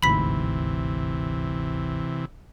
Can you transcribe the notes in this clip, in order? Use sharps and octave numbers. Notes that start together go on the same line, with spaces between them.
G1 D2 G#2 C3 E3 B5 B6